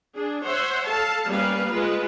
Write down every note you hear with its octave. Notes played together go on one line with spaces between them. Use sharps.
D4 G#4
C5 C#5 E5 F#5
A4 F5 A5
G3 A#3 B3 C#4 B4 F5
G#3 F4 B4